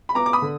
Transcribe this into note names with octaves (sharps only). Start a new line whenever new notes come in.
B5
B3 A#5 D6
D6
B5 D#6
D3